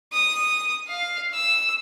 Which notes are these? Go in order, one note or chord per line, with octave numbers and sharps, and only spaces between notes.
D#6
F5
E6